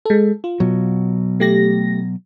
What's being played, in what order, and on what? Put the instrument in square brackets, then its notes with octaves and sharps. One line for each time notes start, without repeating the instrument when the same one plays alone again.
[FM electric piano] G#3 A4
F4
[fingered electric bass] B2 F#3
[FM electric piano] A3 G4 A#6